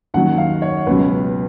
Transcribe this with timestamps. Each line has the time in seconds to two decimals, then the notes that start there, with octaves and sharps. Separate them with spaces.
0.14 D#2 D#3 F#3 F#5
0.38 F5
0.62 C#5
0.86 C#2 B2 F#3 B4